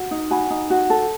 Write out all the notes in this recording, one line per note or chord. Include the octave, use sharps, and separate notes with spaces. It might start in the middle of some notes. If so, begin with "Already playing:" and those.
Already playing: F#4
D#4
F#4 G#5 B5
D#4
F#4
A4